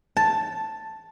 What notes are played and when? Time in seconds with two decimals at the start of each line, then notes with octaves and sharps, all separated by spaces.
0.17 A5